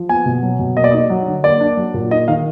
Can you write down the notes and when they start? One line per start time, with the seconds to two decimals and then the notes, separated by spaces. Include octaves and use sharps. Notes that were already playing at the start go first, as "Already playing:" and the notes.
Already playing: F3
0.09 B3 G#5
0.26 B2
0.43 F#3
0.59 B2
0.77 A#3 D#5
0.84 D5
0.91 D#4 D#5
1.10 F#3
1.27 D3
1.44 A#3 D5
1.60 D4
1.77 F#3
1.94 A#2
2.11 D#4 D#5
2.28 D#3 F5